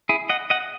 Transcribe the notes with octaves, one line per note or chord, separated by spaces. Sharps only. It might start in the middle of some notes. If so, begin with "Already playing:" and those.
E4 G#4
D#5 F#5
D#5 F#5